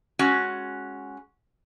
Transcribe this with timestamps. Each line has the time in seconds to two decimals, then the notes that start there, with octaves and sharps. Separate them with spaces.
0.19 G#3 C#4 F#4